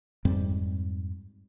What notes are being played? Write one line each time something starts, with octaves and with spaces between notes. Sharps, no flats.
F2 G#2 G3 C4